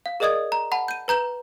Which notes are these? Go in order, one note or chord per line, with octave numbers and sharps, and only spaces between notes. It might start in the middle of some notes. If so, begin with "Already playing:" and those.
F5
G#4 A#4 D5 D#5 D#6 G#6
A#5
F#5 A5 B5
G6 D#7
B4 A#5 G6 E7